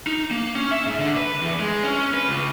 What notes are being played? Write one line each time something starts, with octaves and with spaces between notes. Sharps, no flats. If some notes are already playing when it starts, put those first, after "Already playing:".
D#4
A#3
C#4
E5
G#2
D3
B4
E2
G#3
C#4
B4
C#2